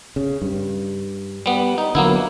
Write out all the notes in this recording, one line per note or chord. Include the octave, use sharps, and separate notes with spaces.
C#3
G2
G3 B3
D#4
D3 E3 F#3 A#3 B3 E4